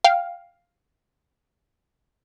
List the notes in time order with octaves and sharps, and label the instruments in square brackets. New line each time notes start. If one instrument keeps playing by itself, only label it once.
[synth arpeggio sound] F5 G5